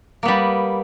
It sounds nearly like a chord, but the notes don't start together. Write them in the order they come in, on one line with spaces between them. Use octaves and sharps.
A#3 B3 G3